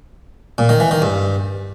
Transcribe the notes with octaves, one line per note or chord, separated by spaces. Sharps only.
A#2
D#3
E3
D#3
G2